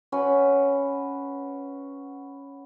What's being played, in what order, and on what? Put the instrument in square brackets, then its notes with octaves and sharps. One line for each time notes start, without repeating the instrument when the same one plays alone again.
[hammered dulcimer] C#4 F#4 B4